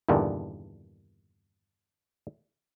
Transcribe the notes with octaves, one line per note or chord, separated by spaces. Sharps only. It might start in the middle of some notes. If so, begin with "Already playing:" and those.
E2 G2 A#2 D3 D#3